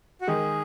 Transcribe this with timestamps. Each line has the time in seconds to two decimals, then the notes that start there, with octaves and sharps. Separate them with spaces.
0.21 F#4
0.27 D#3 G#3 D#4 G#4